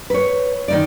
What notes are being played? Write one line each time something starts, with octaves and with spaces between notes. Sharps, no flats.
B4 C#5
D#3 D#4 D5